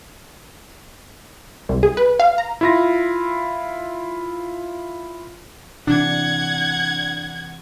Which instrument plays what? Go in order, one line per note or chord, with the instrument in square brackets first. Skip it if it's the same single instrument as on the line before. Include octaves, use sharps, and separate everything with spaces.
[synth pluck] C2
G#4
B4
F5
A#5
[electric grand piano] E4 F4 A#6
[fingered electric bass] C3 E3 [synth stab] D4 [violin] F#5 G#6